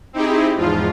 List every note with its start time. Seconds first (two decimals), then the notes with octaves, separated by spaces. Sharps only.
0.13 C4 D#4 E4 G4 G#4
0.56 E2 G#2 F3 F4